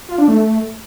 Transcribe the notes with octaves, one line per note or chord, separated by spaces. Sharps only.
F4
D4
A3